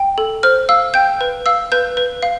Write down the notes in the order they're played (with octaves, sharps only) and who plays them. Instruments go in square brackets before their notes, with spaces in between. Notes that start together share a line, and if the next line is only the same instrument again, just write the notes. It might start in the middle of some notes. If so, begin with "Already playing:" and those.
Already playing: [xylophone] G5
A4
C5 F6
F5 E6
G5 G6
B4
F5 E6
B4 G6
B4
F5